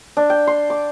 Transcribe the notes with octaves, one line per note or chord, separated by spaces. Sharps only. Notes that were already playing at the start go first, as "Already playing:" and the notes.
D4
G5
C6
D6